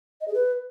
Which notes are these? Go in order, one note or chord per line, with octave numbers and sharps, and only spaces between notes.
D#5
G#4
B4